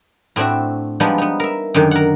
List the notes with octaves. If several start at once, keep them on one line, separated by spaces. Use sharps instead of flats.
A2 C4 D4 F#4 E5
F3 G3 G#3 B3 D4 D#4
B3 D#4
A#4 E5
F#2 D3 D#3
A#4 F#5